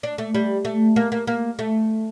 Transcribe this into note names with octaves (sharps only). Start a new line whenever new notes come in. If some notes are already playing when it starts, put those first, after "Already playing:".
D4
A3
G3
A3
A#3
A#3
A#3
A3